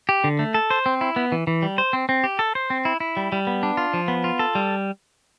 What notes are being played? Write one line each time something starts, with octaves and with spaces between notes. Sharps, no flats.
G4
D3
A3
A4
C5
C4
E4
B3
E3
E3
G3
C5
C4
C4
G4
A4
C5
C4
E4
E4
G3
G3
B3
D4
F4
F3
B3
F4
A4
G3